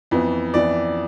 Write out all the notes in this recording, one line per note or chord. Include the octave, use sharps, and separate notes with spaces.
F2 E3 B3
F2 E3 B3 D5